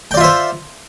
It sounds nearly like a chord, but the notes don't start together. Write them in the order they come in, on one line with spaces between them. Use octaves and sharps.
G5 D5 F4 E5 C5